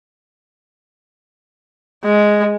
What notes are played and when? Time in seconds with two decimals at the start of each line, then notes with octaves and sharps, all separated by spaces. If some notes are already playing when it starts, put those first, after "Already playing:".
2.04 G#3